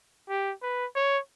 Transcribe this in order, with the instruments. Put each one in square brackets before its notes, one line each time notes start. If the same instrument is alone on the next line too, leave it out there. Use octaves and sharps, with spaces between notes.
[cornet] G4
B4
C#5